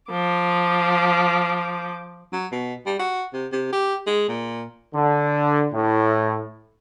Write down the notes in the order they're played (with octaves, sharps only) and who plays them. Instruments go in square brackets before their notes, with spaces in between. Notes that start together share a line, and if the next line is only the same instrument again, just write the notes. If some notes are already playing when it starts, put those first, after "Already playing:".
[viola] F3 D6
[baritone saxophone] F#3
B2
G3
F#4
C3
C3
G4
G#3
A#2
[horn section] D3
A2